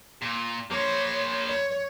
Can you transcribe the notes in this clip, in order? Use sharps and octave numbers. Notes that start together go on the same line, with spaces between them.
A#2
A#3 C5 C#5
C#5